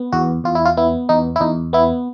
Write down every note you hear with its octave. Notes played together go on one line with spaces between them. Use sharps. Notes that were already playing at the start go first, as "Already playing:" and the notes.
Already playing: B3
E2 F#4
E2 F4
E4
F4
B3 E4
E2 D#4
E4
E2 D#4
B3 E4